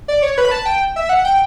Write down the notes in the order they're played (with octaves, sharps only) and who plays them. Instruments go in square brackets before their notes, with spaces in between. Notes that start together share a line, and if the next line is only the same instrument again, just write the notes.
[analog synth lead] D5
C#5
B4
B5
A5
G5
E5
F#5
G5